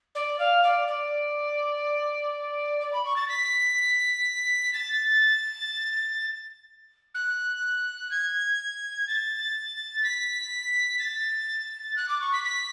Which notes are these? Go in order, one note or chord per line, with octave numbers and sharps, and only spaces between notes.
D5
F5
D5
D5
D5
B5
C#6
A6
B6
A6
F#6
G#6
A6
B6
A6
F#6
D6
C#6
B6
B6